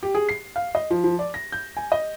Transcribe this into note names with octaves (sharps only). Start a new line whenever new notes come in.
G4
G#4
C7
F5
D#5
F3
F3
D5
A#6
G6
G#5
D#5